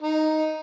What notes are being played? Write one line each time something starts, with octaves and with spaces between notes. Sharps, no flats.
D#4